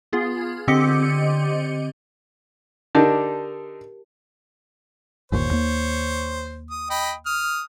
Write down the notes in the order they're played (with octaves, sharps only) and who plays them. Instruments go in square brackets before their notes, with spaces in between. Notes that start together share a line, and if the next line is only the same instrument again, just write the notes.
[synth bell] B3 F4 G#4
D3 C4 G4 D#5 D6 C#7
[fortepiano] D3 D4 D#4 [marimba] G4 A#4 A5
[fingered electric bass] G1 D#2 A#2 [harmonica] C5 C#5
[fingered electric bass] D#2 A#3
[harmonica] D#6
D#5 G5 B5
D#6 F6